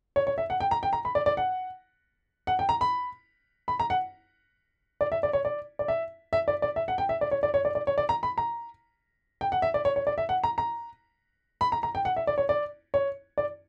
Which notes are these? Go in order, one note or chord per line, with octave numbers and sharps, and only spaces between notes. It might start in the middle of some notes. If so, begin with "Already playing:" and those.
C#5
C#5
E5
F#5
G5
A#5
G5
A#5
B5
D5
D5
F#5
F#5
G5
A#5
B5
B5
A#5
F#5
D5
E5
D5
C#5
D5
D5
E5
E5
D5
D5
E5
F#5
G5
E5
D5
C#5
D5
C#5
D5
D5
C#5
D5
A#5
B5
A#5
G5
F#5
E5
D5
C#5
C#5
D5
E5
F#5
A#5
A#5
B5
A#5
A#5
G5
F#5
E5
D5
C#5
D5
C#5
D5